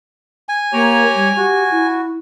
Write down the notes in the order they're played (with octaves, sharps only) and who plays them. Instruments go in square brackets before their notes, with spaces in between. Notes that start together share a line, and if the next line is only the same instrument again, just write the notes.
[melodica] G#5
[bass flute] A#3 [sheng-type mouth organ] G4 C#5 A#5
[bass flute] G3
[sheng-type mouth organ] F#4 [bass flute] G4
[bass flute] E4